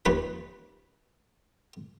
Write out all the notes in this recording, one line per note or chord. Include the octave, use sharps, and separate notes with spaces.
D#2 F3 C#4 B4 B5